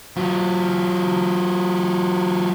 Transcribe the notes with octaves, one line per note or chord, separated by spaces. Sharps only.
F#3 F4